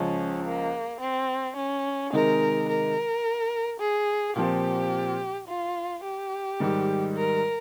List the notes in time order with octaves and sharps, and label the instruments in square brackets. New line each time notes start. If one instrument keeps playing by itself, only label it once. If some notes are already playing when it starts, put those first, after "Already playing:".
Already playing: [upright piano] C#2 C#3 F3 [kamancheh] C#4
[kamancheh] A#3
C4
C#4
[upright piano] C3 D#3 G#3 D#4 [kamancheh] A#4
[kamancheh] A#4
G#4
[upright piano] A#2 F3 C4 [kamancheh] G4
[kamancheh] F4
G4
[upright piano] G#2 D#3 G3
[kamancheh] A#4